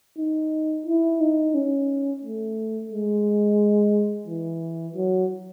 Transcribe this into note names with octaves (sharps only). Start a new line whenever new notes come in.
D#4
E4
D#4
C#4
A3
G#3
E3
F#3